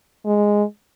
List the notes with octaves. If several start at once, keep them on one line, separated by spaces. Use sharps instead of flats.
G#3